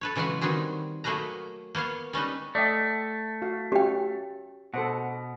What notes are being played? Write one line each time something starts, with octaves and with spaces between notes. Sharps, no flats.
A4 B4 C#5
C#3 E3 F#3 G#3 F#4 B4
D#3 G3 C4 F#4 G#4
F#3 A3 A#3 G#4 B4 A#5
A#3 B3 C#5 F5
G3 C#4 D#4 B4
A3 D5 D#5 G5
F#4 F5
C#4 F#4 G4 G5
B2 A4 C5 F#5